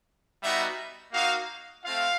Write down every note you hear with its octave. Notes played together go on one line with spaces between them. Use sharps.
G3 B3 D#4 F#4 E5
A#3 D#4 F#4 F5
A3 C4 F4 F5